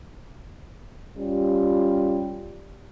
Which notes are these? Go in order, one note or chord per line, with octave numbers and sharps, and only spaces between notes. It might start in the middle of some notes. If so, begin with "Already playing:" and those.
G3 C#4 F4 G4